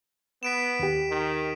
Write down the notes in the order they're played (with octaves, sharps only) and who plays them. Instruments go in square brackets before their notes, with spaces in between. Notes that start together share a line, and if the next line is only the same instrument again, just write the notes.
[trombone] B3 [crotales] B6 D7 E7
[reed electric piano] D#2 G4
[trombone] D#3